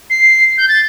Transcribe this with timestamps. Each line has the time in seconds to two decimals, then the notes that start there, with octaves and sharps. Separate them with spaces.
0.10 C7
0.58 G6
0.68 A6